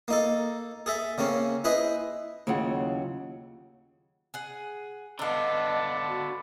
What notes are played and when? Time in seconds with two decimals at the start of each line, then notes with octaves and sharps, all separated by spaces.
0.08 A#3 D#4 A4
0.86 G#4 A4 E5
1.18 C#3 A#3 C4 C#4
1.64 E4 G#4 B4 C5 D#5
2.47 D#2 C#3 F#3 E4 F4 F#5
4.34 G#4 F#5
5.19 D3 B3 D4 A4 D5 D#5 F5 A5
6.08 F#4